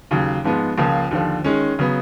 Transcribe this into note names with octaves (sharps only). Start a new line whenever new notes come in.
D#2 C#3 F#3
G#2 F3 G#3 B3
C#2 C#3 F3 A#3
D#2 D3 F3
D#3 G#3 C#4
C#3 F#3 B3